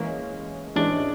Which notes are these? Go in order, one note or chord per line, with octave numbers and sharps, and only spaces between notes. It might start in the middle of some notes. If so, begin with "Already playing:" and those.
Already playing: E3 G#3 A#3 C#4
E3 G#3 C#4 D4